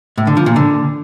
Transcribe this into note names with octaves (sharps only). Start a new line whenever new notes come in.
A2
D3
F3
A#2
D3